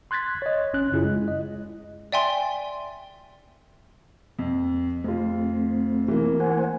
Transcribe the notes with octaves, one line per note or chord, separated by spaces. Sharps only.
C6 F#6 G#6 A6 B6
C#5 D#5
G1 C#4 F#6
F#2 C#3 E4 F4 G#4
G#3
D#5
D5 E5 G5 G#5 C6
F2
F2 A3 C4 F4
E3 A#3
C5 F#5 G#5